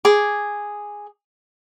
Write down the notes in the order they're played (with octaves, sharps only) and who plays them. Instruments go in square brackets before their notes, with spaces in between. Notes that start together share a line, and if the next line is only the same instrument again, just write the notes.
[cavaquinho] G#4 D6